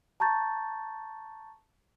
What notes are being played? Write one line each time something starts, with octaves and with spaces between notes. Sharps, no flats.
A5 A#5 C#6 G6 A6